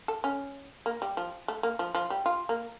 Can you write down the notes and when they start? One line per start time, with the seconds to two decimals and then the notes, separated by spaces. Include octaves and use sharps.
0.08 A4
0.24 C#4
0.86 A#3
1.02 G3
1.17 F3
1.48 A3
1.63 A#3
1.79 F3
1.95 F3
2.10 G3
2.26 F4
2.49 A#3